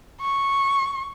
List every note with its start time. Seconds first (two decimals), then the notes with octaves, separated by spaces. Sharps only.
0.21 C#6